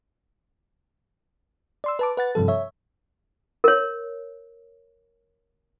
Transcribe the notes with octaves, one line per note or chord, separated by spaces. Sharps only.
D5 C6 E6
B4 A5 D6
B4 F#5 A6
G2 C3 F3 A4
C#5 E5
A#4 C#5